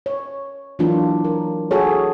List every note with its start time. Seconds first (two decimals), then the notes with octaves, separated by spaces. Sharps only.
0.06 C#5
0.79 E3 F#3 A#3 D4 F4
1.25 A#4
1.71 F#4 G#4 A4 C#5